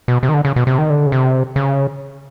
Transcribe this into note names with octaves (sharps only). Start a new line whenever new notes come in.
B2
C3
D#3
D3
C#3
B2
C3
D#3
D3
C#3
C3
C#3